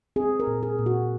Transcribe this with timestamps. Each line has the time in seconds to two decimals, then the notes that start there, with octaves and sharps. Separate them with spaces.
0.16 C4 G#4
0.40 A#4
0.47 A#2
0.63 G#4
0.78 A#2
0.86 F#4